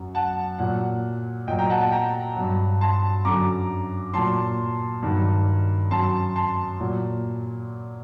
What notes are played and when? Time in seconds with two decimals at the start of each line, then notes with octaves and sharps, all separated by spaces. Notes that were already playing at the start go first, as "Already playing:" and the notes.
Already playing: F#2 F#3
0.15 F#5 A5
0.58 A#2 F#3 F#5
1.47 A#2 F#3 D#5 G5
1.59 G5 A#5
1.69 F#5 A5
1.81 F#5 A5
1.91 G5 A#5
2.36 G2 F#3
2.81 A5 C6
3.25 F#2 D3 F#3 A#5 D6
4.14 A#2 F#3 A5 C6
5.02 G2 D#3 F#3
5.91 F#2 F#3 A5 C6
6.36 A5 C6
6.80 A#2 F#3